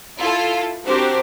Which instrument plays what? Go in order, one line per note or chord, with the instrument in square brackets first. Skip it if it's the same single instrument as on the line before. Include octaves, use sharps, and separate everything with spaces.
[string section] E4 F4 A4
C4 D4 F#4 G4 A#4 C5